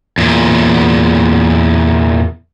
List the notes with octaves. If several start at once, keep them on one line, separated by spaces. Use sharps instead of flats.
E2 A#2